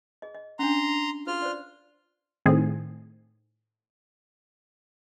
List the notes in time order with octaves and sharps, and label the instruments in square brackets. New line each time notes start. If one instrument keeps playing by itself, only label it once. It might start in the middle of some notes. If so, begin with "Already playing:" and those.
[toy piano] G#4 D#5
D#5
[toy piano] C#4 D4 [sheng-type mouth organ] A#5 C6
[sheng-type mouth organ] F4 F6 [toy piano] F#4 G#4 C5
[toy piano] C5 D5
[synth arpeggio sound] A2 D#3 C4 G#4